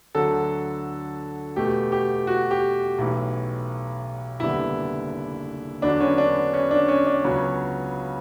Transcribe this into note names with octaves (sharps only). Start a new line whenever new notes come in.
D2 D3 F#3 A4
E2 B2 A3 G4
G4
F#4
G4
B1 A2 E3
F#1 E2 D3 G3 B3 E4
E2 D3 F#3 B3 D4
C#4
D4
C#4
D4
C#4
D4
C#2 C#3 F#3 B3 C#4